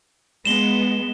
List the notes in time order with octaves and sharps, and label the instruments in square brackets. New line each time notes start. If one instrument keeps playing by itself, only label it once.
[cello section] G#3 B3 [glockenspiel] E7 G7